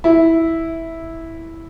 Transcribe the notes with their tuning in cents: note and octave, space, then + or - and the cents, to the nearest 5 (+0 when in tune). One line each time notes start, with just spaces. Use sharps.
E4 -10